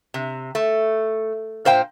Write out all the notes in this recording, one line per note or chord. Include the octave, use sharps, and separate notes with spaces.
C3
A3
A#2 C5 F5 G5